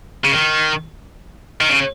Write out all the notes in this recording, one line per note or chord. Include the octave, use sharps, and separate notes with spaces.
C#3
D#3
D#3
C#3